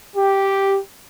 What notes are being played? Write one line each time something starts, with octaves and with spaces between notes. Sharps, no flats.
G4